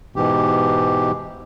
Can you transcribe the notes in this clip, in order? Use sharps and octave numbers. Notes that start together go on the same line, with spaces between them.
G#2 B2 E3 G4